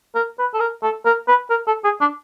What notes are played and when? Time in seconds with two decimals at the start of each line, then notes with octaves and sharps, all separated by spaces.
0.15 A#4
0.39 B4
0.54 A4
0.60 A#4
0.83 A4
1.05 A#4
1.28 B4
1.50 A#4
1.67 A4
1.84 G#4
2.01 D4